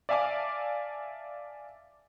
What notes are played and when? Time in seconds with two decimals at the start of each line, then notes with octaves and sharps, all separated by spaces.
0.09 D5 E5 F5 G#5 A5 D6